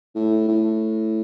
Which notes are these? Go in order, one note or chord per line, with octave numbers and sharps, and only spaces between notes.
A2
A2